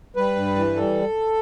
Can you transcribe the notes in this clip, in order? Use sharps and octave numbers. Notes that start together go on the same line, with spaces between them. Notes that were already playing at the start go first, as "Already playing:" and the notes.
G3 B4
G2
E3
G3 A4